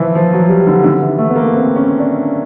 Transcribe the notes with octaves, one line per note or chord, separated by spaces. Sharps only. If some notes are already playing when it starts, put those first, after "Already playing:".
Already playing: E3 F3
F3
F#3
G3
D3
D3
E3
A3
B3
A#3
C4
C#4
D4